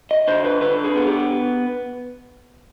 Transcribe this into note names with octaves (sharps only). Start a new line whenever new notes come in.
D#5
D3 C5
B4
D3 B4
G#4
B3
G4